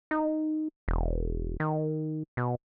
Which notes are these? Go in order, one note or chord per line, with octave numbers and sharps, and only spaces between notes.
D#4
E1
D#3
B2